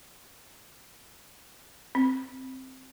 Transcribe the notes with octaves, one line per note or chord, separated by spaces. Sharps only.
C4